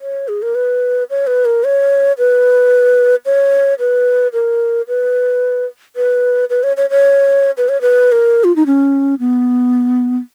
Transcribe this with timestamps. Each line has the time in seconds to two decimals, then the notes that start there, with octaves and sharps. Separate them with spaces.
0.01 C#5
0.28 G#4
0.42 A#4
0.55 B4
1.10 C#5
1.27 B4
1.45 A#4
1.64 C#5
2.18 B4
3.26 C#5
3.79 B4
4.33 A#4
4.88 B4
5.96 B4
6.50 B4
6.63 C#5
6.77 C#5
6.90 C#5
7.57 B4
7.69 C#5
7.81 B4
8.12 A#4
8.44 F4
8.56 D#4
8.66 C#4
9.20 B3